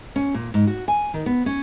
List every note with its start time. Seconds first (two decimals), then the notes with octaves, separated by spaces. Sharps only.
0.16 C#4
0.34 A#2
0.54 G#2
0.67 F#4
0.88 G#5
1.14 D#3
1.26 B3
1.46 C#4